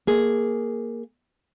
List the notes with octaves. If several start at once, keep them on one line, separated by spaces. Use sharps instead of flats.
A#3 G#4